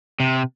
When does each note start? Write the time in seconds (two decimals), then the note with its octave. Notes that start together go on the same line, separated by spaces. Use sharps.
0.20 C3